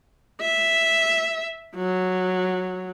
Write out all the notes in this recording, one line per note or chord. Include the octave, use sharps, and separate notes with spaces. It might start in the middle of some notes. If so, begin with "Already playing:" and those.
E5
F#3